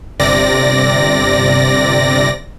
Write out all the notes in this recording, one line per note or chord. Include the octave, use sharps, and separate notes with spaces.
G1 C3 D5 A#6